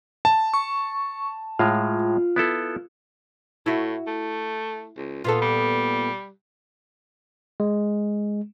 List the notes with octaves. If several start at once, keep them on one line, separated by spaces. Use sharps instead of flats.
A5
C#6
A2 G#3 F4
B3 E4 A4
A2 E4 F#4
A3
C#2
A#2 B3 F4 A4
G3
G#3